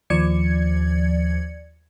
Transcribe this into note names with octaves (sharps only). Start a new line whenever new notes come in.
D#2 F3 D5 G#6 C#7